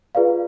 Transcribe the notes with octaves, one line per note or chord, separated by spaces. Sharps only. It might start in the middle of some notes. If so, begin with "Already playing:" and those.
F4 G#4 B4 D5 F5